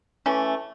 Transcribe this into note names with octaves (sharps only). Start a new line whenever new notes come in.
E3 A3 C#4